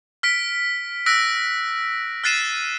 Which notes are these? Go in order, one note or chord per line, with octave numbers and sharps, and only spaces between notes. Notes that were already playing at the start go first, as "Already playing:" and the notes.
F6 B6 D7
E6 F#6 A#6 B6 D7
F6 F#6 A6 C7 D#7 E7